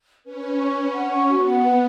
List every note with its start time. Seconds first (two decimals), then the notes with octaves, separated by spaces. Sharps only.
0.24 C#4 B4
0.41 B4
0.59 C#6
0.76 C#4 B4
0.94 F#5
1.11 C#6
1.28 B3 F#4
1.46 F#5
1.63 B4